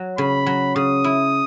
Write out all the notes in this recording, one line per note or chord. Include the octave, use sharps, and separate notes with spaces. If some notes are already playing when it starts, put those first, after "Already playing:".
Already playing: F#3
C#3 B5
F#3
C#3 D#6
E4